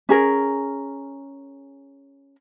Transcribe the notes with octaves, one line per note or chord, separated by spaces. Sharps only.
C#4 G#4 A#4